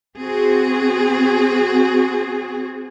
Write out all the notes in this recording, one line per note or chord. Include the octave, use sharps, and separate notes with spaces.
C4 F#4 G#4